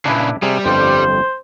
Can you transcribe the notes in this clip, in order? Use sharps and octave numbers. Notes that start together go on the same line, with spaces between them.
A#2 C#3 D4 E4 B4
C3 G3 G#4
G1 F2 C5 G5